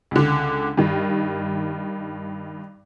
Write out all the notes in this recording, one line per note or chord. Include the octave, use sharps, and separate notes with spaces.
C#2 D3
G2 D#3